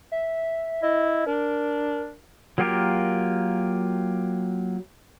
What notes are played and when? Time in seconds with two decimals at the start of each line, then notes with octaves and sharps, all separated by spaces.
0.12 E5
0.83 E4 D#5
1.27 D4 A#4
2.58 F#3 A#3 F4 G4 A#4